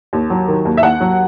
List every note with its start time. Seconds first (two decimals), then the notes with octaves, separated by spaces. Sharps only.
0.13 D#2
0.30 F#3
0.48 D#3
0.65 D#2
0.77 E5
0.83 D#2 F#5
1.00 F#3